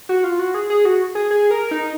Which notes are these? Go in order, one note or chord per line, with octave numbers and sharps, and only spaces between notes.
F#4
F4
F#4
G#4
G#4
F#4
G#4
G#4
A#4
D#4